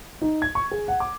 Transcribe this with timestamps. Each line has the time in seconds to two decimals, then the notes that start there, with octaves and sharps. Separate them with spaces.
0.22 D#4
0.42 G#6
0.55 C#6
0.71 G#4
0.88 F#5
1.00 D6